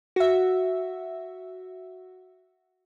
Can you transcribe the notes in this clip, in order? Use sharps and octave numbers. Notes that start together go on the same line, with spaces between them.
F#4 E5